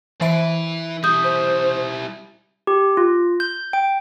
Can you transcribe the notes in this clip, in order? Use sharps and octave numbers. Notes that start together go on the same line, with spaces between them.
E3 E4 B4 E5 D7
G3 E4 D#6 G6
C5
G4
F4
G6
G5